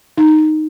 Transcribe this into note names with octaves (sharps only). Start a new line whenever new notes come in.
D#4